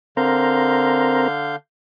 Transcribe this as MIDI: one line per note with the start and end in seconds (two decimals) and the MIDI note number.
0.17 1.56 50
0.17 1.28 60
0.17 1.28 70
0.17 1.56 77
0.17 1.56 91